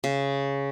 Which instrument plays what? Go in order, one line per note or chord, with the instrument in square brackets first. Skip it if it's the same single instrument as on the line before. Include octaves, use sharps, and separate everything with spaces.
[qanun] C#3